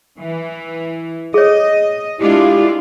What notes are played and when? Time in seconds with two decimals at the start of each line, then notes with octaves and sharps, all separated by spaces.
0.19 E3
1.34 G#4 C#5 D#5
2.19 G#3 D4 E4 F4 G4